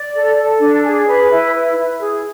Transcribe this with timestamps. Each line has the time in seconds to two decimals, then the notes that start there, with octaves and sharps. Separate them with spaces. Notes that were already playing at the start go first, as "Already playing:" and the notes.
Already playing: D5
0.14 A4
0.36 A4
0.60 D4
0.83 G#4
1.06 B4
1.29 E4
1.54 B4
1.76 E4
1.99 G#4